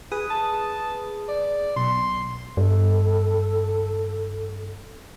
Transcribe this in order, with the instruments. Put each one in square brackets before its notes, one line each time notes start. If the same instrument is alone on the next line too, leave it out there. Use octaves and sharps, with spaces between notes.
[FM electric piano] G#4 B4 D#6
[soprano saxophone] A5
D5
[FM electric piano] B1 [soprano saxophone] C6
[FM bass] G2 [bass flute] A4